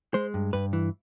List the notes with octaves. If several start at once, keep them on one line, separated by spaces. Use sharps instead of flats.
G#3 C5
G2
G2 B4
E3